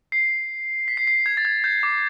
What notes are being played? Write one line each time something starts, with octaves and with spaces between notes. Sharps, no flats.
C7
B6
C7
C7
G#6
A6
G#6
G6
D6